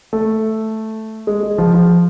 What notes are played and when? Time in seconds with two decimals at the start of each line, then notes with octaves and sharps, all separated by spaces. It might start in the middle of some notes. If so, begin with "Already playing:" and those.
0.13 A3
1.27 G#3
1.43 G#3
1.58 F3
1.74 F3